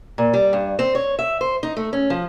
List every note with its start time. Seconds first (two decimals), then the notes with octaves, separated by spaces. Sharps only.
0.18 A#2
0.34 G3
0.53 G2
0.79 C4
0.95 C#5
1.19 E5
1.41 C5
1.63 D#4
1.77 A3
1.93 C#4
2.10 F3